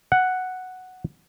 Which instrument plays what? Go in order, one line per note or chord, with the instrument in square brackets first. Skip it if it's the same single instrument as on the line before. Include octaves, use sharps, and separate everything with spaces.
[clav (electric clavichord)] F#5